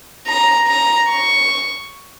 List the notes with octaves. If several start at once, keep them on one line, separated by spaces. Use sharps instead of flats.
A#5
A#5
C#6